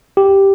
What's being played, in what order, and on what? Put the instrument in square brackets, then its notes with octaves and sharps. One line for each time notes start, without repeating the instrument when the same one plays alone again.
[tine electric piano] G4